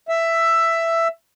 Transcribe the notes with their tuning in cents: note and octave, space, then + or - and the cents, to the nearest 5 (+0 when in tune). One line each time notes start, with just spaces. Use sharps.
E5 +10